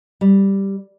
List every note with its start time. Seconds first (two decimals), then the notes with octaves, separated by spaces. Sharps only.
0.21 G3